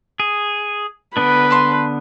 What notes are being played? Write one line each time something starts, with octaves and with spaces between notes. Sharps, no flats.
G#4
D3 B3 D4 B4
A5 C6